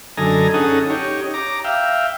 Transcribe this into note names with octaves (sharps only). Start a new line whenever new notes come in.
F#2 D3 A4 D#5 G#5 A#5
C#4 D#4 G#4 A4 F#5 D#6
D#4 G4 C#5
A#5 D6
E5 F5 G5